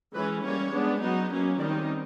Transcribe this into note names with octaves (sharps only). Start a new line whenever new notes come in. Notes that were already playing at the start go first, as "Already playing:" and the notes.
E3 G#3 C#4 B4
G3 A#3 C#4 C#5
G#3 B3 D4
F#3 B3 D#4
F#3 A#3 C#4
D#3 G3 C4 D#4 D5